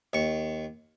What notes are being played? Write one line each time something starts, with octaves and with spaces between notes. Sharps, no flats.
D#2 C#6